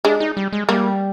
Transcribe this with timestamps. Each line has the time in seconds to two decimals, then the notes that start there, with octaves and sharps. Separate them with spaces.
0.05 G#3 D4
0.20 D#4
0.37 G3
0.53 G#3
0.69 G3 A#3